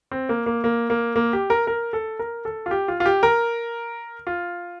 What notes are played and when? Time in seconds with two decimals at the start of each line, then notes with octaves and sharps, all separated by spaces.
0.11 C4
0.29 A#3
0.46 A#3
0.64 A#3
0.90 A#3
1.16 A#3
1.33 G4
1.50 A#4
1.67 A#4
1.93 A4
2.19 A#4
2.45 A4
2.66 F4
2.71 G4
2.88 F4
3.00 F4
3.06 G4
3.23 A#4
4.27 F4